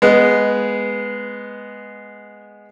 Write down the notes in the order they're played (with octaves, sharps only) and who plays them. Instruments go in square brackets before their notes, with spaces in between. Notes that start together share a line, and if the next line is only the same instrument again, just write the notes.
[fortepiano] G#3 B3